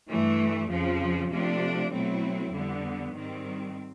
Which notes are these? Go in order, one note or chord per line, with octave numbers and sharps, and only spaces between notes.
G2 E3 A3
F2 C#3 F3
C3 F3 A3 D4
B2 F#3 A3 C4 E4
F2 D3 G3 B3
G#2 D#3 G3 C4